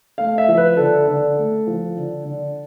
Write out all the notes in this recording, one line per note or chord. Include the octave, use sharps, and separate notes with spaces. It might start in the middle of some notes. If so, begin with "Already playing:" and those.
A3 F5
E5
F3
B4
D3 A4
D3
A3
F3
D3
D3